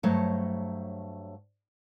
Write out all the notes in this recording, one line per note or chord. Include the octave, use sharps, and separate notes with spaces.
G2 F#3 A3 A4 C5 C#5